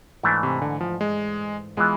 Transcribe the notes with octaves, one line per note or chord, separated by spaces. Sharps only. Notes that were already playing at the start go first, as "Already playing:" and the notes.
G#2 E3 A3 D4
C3
D3
F3
G#3
E3 G#3 B3 F4